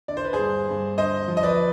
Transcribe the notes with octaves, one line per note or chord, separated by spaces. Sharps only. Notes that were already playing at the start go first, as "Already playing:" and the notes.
D3 D5
C5
B4
G#4 C5
G2
G2
D3 C5 D#5
F3
D#5
B4 D5